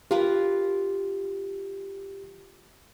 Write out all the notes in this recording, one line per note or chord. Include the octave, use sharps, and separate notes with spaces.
F4 G4 A#4 B4